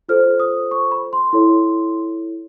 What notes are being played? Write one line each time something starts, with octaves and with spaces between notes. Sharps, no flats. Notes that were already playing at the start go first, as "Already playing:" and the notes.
F4 A4 C5 F6
D#6
C#6
B5
C6
E4 A4 C#5 C6